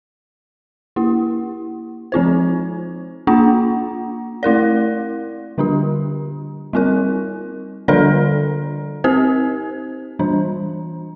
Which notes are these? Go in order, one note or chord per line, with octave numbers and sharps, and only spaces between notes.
A#3 E4 G4
F3 C4 F4 C5
A#3 D4 F4
A3 E4 A#4 D5
D3 G3 D4 G4
G3 C4 F4 A#4
D3 G3 D4 A4 D5
C4 G4 C5
E3 G3 D4